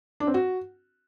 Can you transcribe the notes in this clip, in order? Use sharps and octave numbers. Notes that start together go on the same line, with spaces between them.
D4
C4
F#4